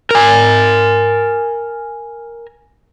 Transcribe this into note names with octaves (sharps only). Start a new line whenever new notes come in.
A#4 G#5